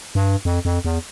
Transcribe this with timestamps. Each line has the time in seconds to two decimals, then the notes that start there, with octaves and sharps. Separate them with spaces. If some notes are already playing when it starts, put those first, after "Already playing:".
0.15 G2
0.45 F2
0.65 F2
0.85 E2